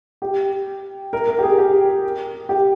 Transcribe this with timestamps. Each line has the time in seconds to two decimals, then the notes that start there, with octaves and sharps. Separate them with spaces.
0.22 G4
1.13 A#4
1.28 A#4
1.39 G4
1.43 G#4
1.58 G4
2.49 G4